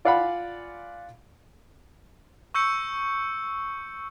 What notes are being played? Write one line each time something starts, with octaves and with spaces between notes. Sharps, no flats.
F4 D5 F5 F#5 G#5 B5
C#6 E6 G6 C#7